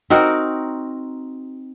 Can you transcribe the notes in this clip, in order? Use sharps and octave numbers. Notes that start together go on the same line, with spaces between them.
C4 D#4 F#4 A#4